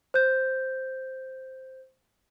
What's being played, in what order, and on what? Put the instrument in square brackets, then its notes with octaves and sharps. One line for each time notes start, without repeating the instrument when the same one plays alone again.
[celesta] C5 G6